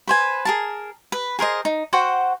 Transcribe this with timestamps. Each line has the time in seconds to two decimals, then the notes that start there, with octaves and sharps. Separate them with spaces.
0.08 B4 C5 G#5
0.45 G#4 A#4 A5
1.12 B4
1.39 G#4 A#4 C5 D#5
1.65 D#4
1.93 F#4 C5 F#5 G5